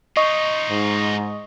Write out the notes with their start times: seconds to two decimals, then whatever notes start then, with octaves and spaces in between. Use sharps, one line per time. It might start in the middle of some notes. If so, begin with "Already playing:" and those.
0.17 D#4 F4 D#5 C#6 D#6
0.70 G#2